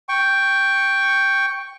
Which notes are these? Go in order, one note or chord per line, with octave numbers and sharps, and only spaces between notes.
G5 C#6